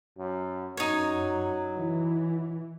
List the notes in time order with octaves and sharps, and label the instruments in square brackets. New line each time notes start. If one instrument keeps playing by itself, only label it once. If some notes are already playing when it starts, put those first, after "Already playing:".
[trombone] F#2
[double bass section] F#2 [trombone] F#3 [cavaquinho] D#4 C#5
[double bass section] E3